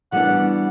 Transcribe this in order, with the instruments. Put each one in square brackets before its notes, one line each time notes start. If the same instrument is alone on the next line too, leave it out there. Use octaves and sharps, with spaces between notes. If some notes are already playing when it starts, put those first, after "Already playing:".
[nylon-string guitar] E3 G3 B3 D4 F#4 [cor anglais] F#5